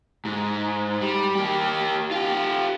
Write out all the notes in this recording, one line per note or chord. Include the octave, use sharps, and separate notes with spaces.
G#2
G3
A#3 G4
F4 G4